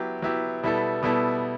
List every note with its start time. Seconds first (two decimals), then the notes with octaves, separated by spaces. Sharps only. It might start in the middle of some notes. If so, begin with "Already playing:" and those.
Already playing: F#3 B3 E4 G4
0.22 F#3 B3 E4 G4
0.63 B2 G3 B3 E4 A4
1.03 B2 G3 B3 E4 A4